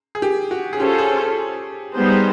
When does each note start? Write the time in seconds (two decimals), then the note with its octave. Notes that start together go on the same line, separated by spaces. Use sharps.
0.15 G#4
0.22 G4
0.51 F#4
0.73 G#4
0.79 C#4 F4 G4 A4 C5
0.98 G#4
1.93 G3 B3 D#4 G#4 C5